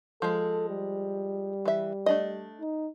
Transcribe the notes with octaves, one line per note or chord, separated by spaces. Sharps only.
F3 G#3 A4
G3
E3 E5
A3 D4 D#5
D#4